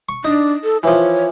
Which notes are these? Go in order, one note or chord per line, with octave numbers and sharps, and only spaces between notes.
C#6
D4 D#4
A4
E3 F3 C#5